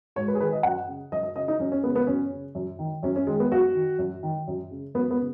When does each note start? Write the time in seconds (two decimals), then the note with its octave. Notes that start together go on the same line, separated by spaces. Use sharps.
0.16 G#2 C#5
0.28 B4
0.35 G#4
0.40 D#3 B4
0.52 D#5
0.63 F#2 F#5
0.87 C#3
1.12 F#2 D#5
1.23 D#5
1.35 C#3 D#5
1.48 D#4
1.59 F#2 C#4
1.72 C#4
1.83 C#3 B3
1.96 B3
2.07 F#2 C#4
2.32 C#3
2.55 F#2
2.79 D#3
3.03 F#2 C#4
3.16 C#4
3.27 D#3 G#3
3.40 B3
3.51 F#2 F#4
3.75 D#3
3.99 F#2
4.23 D#3
4.47 F#2
4.71 C#3
4.94 F#2 B3
5.11 B3
5.19 C#3